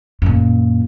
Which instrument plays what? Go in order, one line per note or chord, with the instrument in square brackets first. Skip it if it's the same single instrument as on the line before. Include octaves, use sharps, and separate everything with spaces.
[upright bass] F#2 A#2